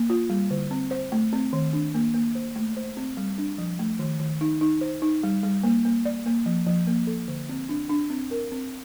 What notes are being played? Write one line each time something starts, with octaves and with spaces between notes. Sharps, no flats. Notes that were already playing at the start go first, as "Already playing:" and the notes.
Already playing: A#3
F4
G3
D3
C4
C5
A3
C4
D#3
D4
A#3
A#3
C5
A3
C5
C4
G3
D4
F3
A3
D#3
D#3
D#4
D#4
C5
D#4
G3
G3
A#3
A#3
D5
A#3
F3
F3
A#3
A4
D3
C4
D4
D4
C4
A#4
C4